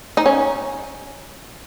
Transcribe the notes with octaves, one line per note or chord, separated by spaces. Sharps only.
D#4
C#4